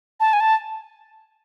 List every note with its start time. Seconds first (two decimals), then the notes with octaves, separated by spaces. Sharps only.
0.20 A5
0.33 G#5
0.40 A5